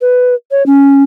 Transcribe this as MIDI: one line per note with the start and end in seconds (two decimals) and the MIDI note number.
0.01 0.34 71
0.51 0.65 73
0.66 1.03 61